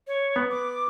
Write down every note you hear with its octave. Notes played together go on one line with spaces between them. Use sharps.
C#5
B3
D6